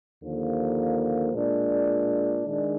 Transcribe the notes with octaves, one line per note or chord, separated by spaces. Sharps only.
D#2 D3 F3 A#3
A#2 G#3 D4
D#3 G#3 D4